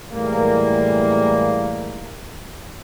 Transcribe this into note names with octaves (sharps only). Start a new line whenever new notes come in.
A2 E3 G3 G#3 A#3